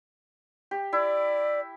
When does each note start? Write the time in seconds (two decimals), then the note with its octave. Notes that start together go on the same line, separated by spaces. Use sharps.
0.71 G4
0.93 E4 D5